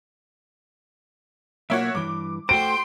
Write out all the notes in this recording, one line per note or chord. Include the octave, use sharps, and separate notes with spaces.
B1 A#3 F#4 C#5 E5
G2 E3 D6
A3 F#4 C5 G5 C6 D7